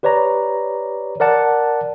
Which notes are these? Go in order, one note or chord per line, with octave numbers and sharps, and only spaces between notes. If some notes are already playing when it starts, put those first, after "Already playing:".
G4 B4 C#5 D5 A#5
A#4 D5 F#5 A5